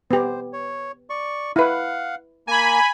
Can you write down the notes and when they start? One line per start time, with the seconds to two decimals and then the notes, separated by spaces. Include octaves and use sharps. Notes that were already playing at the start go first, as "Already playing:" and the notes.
0.11 B3 G4 C5
0.53 C#5
1.10 D5 C#6
1.56 E4 B4 F5 F#5
2.47 A#3 G#5 A#5 B5